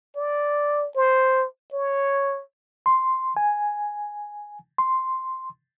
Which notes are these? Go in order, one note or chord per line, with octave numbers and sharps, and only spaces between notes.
D5
C5
C#5
C6
G#5
C6